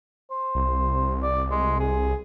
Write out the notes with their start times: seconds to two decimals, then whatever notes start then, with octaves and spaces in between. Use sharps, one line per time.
0.31 C5
0.55 C2
1.22 D5
1.51 G#3
1.80 G#4